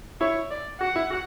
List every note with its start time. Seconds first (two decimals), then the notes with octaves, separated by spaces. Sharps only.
0.21 E4 C#5
0.51 D5
0.81 F#4 F#5
0.96 E4
1.10 F#4